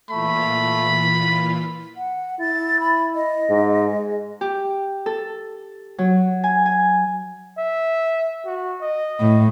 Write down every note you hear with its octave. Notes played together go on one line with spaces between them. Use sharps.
A#2 E3 A3 F4 B5
F#5
E4 A6
B5
D#5
G#2
G#3
G4
A4
F#3
G#5
G#5
E5
F#4
D#5
A2